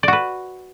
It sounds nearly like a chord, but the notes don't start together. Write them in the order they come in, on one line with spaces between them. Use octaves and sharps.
D5 F#4 B4